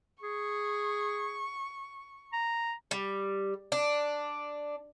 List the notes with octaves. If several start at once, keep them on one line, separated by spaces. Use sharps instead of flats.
G#4 C#6
A#5
G3
D4